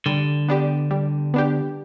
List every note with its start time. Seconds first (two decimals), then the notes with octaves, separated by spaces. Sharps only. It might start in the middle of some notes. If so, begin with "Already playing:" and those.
0.06 D3 G3
0.49 B3 D4 G4
0.91 G3
1.34 B3 D4 G4